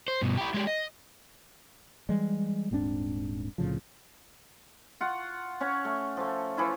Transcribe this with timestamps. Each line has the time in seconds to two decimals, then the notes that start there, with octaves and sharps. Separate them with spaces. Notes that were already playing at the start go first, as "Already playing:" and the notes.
0.08 C5
0.22 G2 B2
0.37 E4 G4
0.54 G#3 G4
0.67 D#5
2.09 E3 G3 G#3
2.71 D#1 G#2 C4 D4
3.58 C2 A2 C#3 F3
5.01 F4 F#5 C#6
5.61 C#4 C#5 F#5
5.85 A3
6.17 F3 A3
6.57 E3 F3 E4 F4